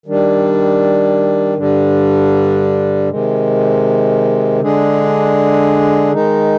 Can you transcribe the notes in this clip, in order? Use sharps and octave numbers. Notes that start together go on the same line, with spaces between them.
D#3 G3 D4
G2 D3 G3 D4
C3 D#3 G#3
D3 G#3 D4 G#4
D#3 G#3 D#4